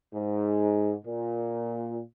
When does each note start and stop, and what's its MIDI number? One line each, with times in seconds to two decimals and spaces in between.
0.14 0.93 44
1.05 2.00 46